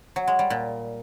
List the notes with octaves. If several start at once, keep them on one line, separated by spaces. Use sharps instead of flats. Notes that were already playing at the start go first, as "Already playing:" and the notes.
F#3
G#3
G3
A#2